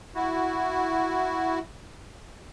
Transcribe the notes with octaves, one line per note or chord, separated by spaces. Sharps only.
E4 F#4